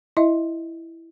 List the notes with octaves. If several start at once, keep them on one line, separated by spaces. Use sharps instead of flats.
E4 D#5 E5